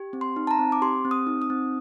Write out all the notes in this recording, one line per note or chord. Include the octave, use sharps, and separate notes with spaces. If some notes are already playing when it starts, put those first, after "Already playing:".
Already playing: G4
C4
C6
D#4
A5
A#5
C4
D6
G4 C6
C4
D#6
D#4
D#6
C4